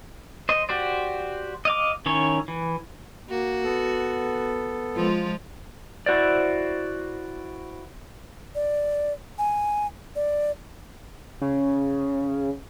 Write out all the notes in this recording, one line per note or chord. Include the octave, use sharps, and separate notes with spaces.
C5 D#5
F#4 G4 C5 D5
D#5 F5 D6
D#3 C#4 E4 C#5
E3
A#3 F#4
B3 A4
F3 G#3 F4
E4 F#4 C5 D5
D5
G#5
D5
C#3